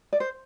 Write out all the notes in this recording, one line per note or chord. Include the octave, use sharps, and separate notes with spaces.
D5
C5